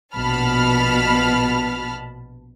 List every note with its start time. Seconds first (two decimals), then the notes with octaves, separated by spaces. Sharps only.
0.15 A#1 B2 A5 B5 F6